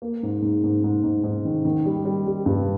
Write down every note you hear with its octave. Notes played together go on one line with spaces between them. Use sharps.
A#3
G#2
G#2
G#2
G#2
G#2
G#2
D#3
D#3
G3
G3
G3
G2